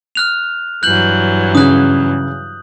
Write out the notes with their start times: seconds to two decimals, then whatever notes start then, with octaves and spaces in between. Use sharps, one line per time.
0.15 F6 F#6 F7
0.83 G2 E3 F#3 F#6 G6 F#7
1.55 C#3 D#6 F#6